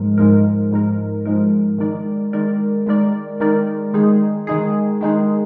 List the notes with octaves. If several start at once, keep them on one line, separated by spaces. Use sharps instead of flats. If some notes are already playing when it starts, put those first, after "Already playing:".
Already playing: G#2 F3 G#3 A#4
G#2 F3 G#3 D#4 A#4
G#2 F3 G#3 D#4 A#4
G#2 F3 G#3 D#4 A#4
D#3 G#3 D#4 A#4 D5
D#3 G#3 D#4 A#4 D5
D#3 G#3 D#4 A#4 D5
D#3 G#3 D#4 A#4 D5
D#3 G#3 D#4 G#4
D#3 G#3 D#4 G#4
D#3 G#3 D#4 G#4